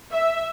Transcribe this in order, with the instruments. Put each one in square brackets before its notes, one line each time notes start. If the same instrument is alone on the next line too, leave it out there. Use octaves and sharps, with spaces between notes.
[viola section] E5